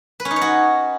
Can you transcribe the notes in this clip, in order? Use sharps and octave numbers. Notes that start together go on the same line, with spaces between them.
B4
C#4
D#4
C#5
F#4